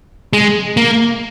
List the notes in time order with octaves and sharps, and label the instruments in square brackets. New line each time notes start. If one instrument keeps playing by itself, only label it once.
[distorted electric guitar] G#3
A#3